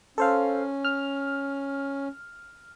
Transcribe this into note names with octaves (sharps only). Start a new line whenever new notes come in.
C#4 A4 C5 F5
F6